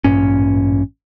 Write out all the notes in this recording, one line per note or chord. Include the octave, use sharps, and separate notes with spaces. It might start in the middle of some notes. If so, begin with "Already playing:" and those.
A1 G2 A#2 C#4